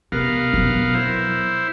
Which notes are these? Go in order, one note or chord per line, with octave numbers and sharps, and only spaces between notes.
C3 B3 A#4 F5
B2 F#3
E4 C5